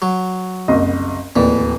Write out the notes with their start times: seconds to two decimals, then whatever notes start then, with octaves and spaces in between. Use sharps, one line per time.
0.02 F#3
0.68 F#1 C2 D#5
1.36 D1 D#2 E3 D5